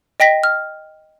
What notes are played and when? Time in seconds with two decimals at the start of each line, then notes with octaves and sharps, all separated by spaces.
0.20 D#5 G5 A#6 B6
0.44 F6